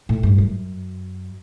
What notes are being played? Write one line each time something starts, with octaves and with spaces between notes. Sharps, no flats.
A2
G2
F#2